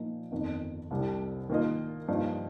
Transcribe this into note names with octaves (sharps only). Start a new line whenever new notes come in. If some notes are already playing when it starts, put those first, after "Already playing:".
Already playing: A#2 F3 A#3 D#4
G1 F2 D#3
C2 C3 G3 D4
D#3 A#3 F4 A#4 D#5
G2 F3 A#3 D#4